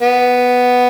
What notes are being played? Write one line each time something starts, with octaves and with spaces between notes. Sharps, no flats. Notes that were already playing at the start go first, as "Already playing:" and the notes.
B3